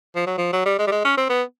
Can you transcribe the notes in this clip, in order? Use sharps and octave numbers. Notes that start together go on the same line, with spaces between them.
F3
F#3
F3
F#3
G3
G#3
G3
G#3
C#4
C4
B3